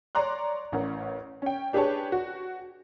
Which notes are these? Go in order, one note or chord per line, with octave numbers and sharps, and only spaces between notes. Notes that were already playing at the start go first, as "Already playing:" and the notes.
C#5 D5 A#5 C6 F#6
A1 C#4 A#4 F#5
C#4 G5
D4 G4 G#4 B4 C#5 A5
F#4